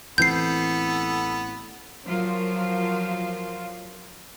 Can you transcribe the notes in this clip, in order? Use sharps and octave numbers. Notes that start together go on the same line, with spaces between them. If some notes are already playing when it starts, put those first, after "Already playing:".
A1 E3 B3 C4 A4 G6 C7
F3 F#3 F4 A#4 C5